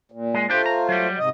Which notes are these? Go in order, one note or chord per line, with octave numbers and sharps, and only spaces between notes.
A#2
G#3
A3 D4 F4 G4 C5
A#5
F#3 G3
G#2 C3 D#5